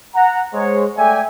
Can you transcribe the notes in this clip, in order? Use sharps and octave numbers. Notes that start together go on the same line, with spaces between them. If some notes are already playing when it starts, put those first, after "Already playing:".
F#5 A#5
G#3 C5 C#5
A3 D5 E5 G5 G#5